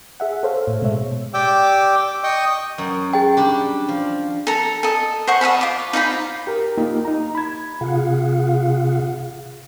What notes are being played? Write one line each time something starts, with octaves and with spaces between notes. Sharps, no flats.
G#4 E5 F#5
A4 C5 C#5 F5
A2
B2 G#3 C#5 E5
G4 D5 G5 D6 E6
D#5 G5 C#6 D#6
F#2
G#4 G5
G3 D4 G4
F3
A4 A#5
A4 D#5
C5 F#5 C#6
D#5 F5 A5 B5
F4 D6
D#4 F4 C5 B5
G4 A#4
A#3 D#4 F4 G4
D#4 A#5
B5 G#6
C3 F4 G#4 F5 F#5